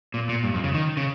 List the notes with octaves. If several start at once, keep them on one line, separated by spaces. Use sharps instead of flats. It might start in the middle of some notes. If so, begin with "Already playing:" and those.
A#2
A#2
G2
F2
C#3
D#3
C#3